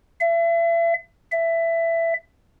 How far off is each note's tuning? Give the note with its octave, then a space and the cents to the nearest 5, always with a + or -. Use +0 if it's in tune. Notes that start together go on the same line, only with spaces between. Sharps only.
E5 +35
E5 +15